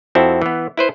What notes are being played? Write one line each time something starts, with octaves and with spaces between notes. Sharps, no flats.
F2 C4 E4 F#4 A4
E3 B3
E4 B4 C5